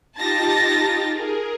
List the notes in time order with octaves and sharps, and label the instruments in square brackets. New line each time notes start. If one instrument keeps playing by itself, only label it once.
[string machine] D#4 F4 G4 [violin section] A5 A6 A#6
[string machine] G#4 A#4